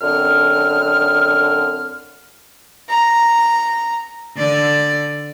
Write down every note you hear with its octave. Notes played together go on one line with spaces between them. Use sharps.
F#2 D3 C4 F6
A#5
D3 D5